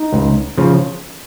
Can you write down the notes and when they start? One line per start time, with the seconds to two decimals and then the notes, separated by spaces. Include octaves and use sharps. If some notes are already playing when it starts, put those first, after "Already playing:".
Already playing: D#4
0.13 C#2
0.58 C#3 F3